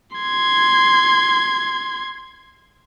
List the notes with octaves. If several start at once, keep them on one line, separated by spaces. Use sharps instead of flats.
C6 G#6